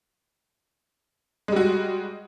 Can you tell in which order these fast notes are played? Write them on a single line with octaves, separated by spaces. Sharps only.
G#3 G3 F#4